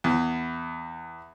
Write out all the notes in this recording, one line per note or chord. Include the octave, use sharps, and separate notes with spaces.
E2